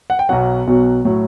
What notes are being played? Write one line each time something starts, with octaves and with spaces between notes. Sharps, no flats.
F#5
G5
B1 B2 F#3 F#5
B1 B2 F#3
A2 F#3